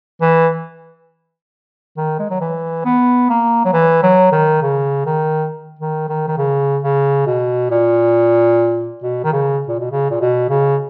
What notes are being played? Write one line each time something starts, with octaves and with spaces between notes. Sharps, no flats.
E3
D#3
G#3
F#3
E3
B3
A#3
F#3
E3
F#3
D#3
C#3
D#3
D#3
D#3
D#3
C#3
C#3
B2
A#2
B2
D#3
C#3
A#2
B2
C#3
A#2
B2
C#3